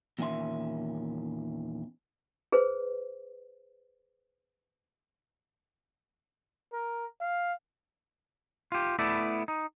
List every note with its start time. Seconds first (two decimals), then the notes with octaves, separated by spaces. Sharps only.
0.19 E2 A#2 D#3 C#4 E5 C6
2.52 G#4 B4 C5
6.73 A#4
7.21 F5
8.72 F4 G4
8.99 A3 B3 E4 D5
9.48 D#4